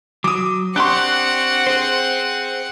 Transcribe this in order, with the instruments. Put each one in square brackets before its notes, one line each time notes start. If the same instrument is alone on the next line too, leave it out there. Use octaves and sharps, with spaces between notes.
[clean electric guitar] F#3 [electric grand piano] D6 D#6
[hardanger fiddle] C4 F#5 [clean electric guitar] D4 G4 [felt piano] C6 C#6 F#6
[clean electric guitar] G#4 C5